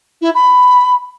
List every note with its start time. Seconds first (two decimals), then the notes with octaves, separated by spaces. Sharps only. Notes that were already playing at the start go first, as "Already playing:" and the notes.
0.21 E4
0.35 B5